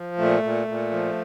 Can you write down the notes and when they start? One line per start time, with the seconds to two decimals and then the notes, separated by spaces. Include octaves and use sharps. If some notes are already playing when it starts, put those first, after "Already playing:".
Already playing: F3
0.18 A#2 A3
0.43 A#2
0.68 A#2
0.92 F3